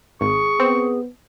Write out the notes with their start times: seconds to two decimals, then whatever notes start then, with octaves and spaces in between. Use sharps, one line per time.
0.21 G#1 G#4 C#6
0.60 B3 C4